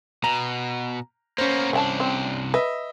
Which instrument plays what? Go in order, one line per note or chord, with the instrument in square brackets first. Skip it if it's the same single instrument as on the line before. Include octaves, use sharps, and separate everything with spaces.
[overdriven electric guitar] B2 [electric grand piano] A#5
[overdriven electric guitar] A#3 B3 [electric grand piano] C#4 C5
[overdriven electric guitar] C2 D4 [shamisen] E5 G5 A5
[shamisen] C4
[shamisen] B4 [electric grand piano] D#5 E5